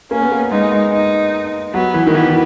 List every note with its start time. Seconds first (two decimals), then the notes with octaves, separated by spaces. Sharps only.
0.11 A#3 C#4
0.22 B3
0.32 A#3
0.51 G#3 D#4
0.72 G#3
0.93 D#4
1.74 F#3 B3
1.94 E3
2.07 D#3
2.14 E3 B3
2.30 E3